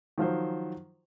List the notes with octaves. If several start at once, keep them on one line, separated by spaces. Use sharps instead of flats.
D#3 F3 F#3 C5